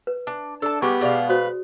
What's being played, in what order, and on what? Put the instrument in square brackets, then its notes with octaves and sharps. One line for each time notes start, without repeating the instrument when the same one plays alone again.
[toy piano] B4
[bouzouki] D4
[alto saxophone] D4 [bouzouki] A4 A5
[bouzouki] G3 G#3 G#4 [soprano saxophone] B3 [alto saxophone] G4 [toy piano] C#6 D6
[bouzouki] B2 G#3 F5 [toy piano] G#4 D5
[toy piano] F#4 C5 D#6 [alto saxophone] B4